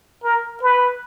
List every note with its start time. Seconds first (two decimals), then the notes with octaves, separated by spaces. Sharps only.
0.23 A#4
0.62 B4